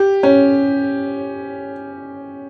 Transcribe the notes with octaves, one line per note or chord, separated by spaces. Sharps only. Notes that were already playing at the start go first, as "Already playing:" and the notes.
Already playing: G4
C#4